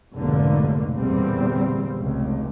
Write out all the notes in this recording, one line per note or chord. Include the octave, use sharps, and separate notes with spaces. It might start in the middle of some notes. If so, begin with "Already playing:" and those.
F1 B1 G#2 D3 A#3
G1 E2 A#2 G3 C4
F1 C#2